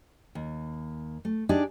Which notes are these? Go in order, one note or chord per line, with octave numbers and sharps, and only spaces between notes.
D#2
A3
D4 D#4 G4 G#4 D5